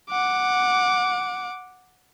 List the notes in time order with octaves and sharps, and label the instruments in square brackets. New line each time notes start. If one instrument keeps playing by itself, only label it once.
[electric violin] F#5 D6